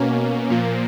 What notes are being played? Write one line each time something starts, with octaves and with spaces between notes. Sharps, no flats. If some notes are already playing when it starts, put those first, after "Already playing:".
Already playing: B2 A#3 C#4
A#2 F3 A#3